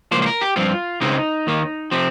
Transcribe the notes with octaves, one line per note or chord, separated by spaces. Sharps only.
C#2 C3 F3 A#3 C5
C5
A#4
G4
G2 F3 C4 F4
C#2 C#3 G#3 C4 D#4
D#2 D#3 A#3
C3 F3 C4